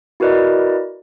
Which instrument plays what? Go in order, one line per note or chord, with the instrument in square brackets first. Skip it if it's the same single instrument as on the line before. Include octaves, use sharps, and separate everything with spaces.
[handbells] E4 F#4 A#4 B4 D5 D#5